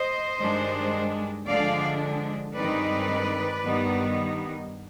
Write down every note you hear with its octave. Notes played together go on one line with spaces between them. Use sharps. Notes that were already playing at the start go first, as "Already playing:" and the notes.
Already playing: C5 D#5
G2 D#3 G#3 D4
D3 F3 G#3 D4 D5 F5
G2 D#3 G#3 C4 D#4 B4 D5
G2 D#3 G3 B3 D#4